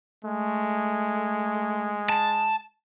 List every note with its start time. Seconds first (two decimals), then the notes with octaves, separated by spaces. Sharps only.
0.24 G#3 A3
2.09 A5